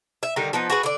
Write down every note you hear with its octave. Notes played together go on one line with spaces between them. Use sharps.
E5
D3 D#3 G3 D#4
F3 B3 D#4
F#4 G#4 B4
D3 D5